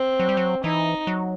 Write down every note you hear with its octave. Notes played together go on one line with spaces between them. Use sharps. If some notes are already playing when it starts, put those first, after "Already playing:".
Already playing: C4
F#3
G3
F#3
E3 D#4
F#3